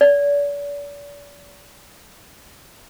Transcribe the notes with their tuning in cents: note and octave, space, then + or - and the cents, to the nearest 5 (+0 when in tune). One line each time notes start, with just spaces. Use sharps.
D5 -40